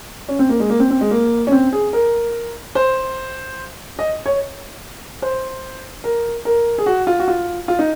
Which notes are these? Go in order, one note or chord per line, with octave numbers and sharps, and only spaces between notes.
C#4
C4
A#3
G#3
A#3
C4
C4
G#3
A#3
C#4
C4
G#4
A#4
C5
D#5
C#5
C5
A#4
A#4
G#4
F#4
F4
F#4
F4
F4
D#4